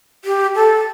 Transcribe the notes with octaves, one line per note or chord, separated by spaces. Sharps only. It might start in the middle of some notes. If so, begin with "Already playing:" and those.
G4
A4